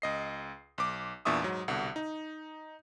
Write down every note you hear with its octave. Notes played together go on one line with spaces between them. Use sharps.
C#2 D#5 C7
B1 D6
E2 A#2 D4 E5 C#6 D#6
G#2 F#3
C2 B2 D3 F#5
D#4